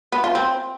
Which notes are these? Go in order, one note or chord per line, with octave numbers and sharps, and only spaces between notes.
B3
F4
C4